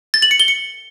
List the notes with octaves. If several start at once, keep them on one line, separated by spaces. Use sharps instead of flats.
A6
F#7
C#7
G7
C#7